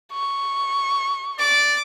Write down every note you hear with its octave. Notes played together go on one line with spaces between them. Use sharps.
C#6
D5 D6